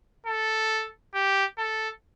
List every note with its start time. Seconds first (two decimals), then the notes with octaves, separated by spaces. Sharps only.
0.26 A4
1.14 G4
1.58 A4